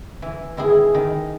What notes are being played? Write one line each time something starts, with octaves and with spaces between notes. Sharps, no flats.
E3
D#3 E4 G#4
D#3